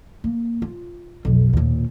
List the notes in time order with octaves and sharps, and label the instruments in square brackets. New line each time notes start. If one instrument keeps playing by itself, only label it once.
[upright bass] A#3
F4
B1 F2
D#2 A#2